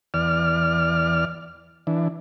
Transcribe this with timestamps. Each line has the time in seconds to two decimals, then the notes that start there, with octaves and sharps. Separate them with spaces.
0.14 E2 D5 F6
1.87 E3 D4